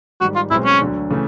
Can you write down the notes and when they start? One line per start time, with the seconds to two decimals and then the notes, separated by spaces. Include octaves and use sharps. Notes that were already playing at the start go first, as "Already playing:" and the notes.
0.21 G#2 D#3 G3 F#4
0.36 F4
0.51 B1 B2 G#3 C4 E4
0.65 C#4
0.80 D2 D3 F#3
1.10 C#3 E3 A3